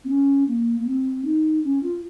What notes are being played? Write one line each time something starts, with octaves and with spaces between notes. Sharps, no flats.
C4
C#4
A#3
A#3
C4
D#4
C#4
F4